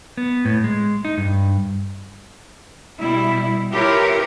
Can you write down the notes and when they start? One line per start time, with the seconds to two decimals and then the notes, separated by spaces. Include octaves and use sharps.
0.17 B3
0.45 A2
0.64 G#3
1.05 D#4
1.18 G2
2.99 B2 G3 E4
3.72 E4 F4 G4 A#4 B4 C#5